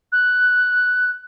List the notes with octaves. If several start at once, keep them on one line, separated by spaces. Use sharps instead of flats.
F#6